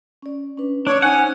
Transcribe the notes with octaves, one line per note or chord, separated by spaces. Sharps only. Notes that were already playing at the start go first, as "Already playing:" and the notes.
C#4 D5
C#4 D4 B4
D4 C#5 E6
C#4 D#4 C5 F#5 G#5